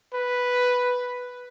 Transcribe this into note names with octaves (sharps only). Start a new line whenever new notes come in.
B4